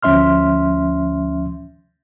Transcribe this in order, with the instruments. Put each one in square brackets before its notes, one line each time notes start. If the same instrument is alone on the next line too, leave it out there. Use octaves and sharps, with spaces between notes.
[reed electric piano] D2 F3 C#4 E5 C6 F6